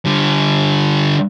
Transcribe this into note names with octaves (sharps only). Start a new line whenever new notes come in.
D3 G3